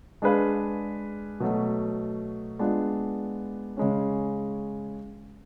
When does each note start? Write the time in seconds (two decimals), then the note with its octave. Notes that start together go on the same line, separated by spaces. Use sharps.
0.22 G#3 D4 G#4 B4 F5
1.40 B2 F#3 A3
2.59 G#3 B3 D4 F4
3.77 C#3 G#3 C#4